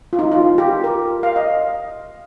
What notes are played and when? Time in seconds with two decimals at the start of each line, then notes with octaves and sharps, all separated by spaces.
0.13 F4
0.19 D#4
0.32 F4
0.58 G4
0.84 A#4
1.23 F5
1.36 D#5